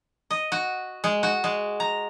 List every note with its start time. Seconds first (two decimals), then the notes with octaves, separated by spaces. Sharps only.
0.31 D#5
0.52 F#4
1.04 G#3
1.23 F#4
1.44 G#3
1.80 A#5